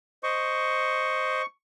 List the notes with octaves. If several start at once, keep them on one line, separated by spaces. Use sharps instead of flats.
C5 D#5 C#6